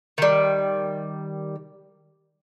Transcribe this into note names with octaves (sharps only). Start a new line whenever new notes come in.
D#3 G3